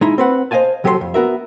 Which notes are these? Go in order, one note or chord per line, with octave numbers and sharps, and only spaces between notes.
G#3 D#4 E4
C4 B4 F#5
C5 D#5 F5 G#5 A5
C2 F#3 G4 A4 C#5 C6
F2
B3 F#4 A#4 E5